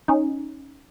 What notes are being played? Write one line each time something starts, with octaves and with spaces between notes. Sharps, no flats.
C#4 D#4